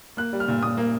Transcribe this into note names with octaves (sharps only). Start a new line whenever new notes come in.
A#3 F#6
G3
F6
A#2
A#2 D#6
A#3